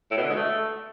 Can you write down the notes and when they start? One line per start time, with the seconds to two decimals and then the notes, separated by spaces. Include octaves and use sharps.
0.11 A2
0.17 B2
0.23 D3
0.30 G#3
0.36 A3